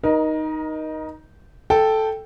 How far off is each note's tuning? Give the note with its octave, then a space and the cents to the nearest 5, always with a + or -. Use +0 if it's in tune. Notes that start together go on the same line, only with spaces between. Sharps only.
D#4 +0 A#4 +30
A4 -5 G5 +0